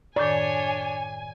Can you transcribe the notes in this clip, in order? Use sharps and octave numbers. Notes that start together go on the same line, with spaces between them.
F#2 A2 D#3 D4 C#5 D5 G#5